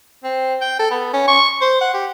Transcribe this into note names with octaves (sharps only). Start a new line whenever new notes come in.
C4
G5
A4
B3
C#4
C#6
C5
F#5
G4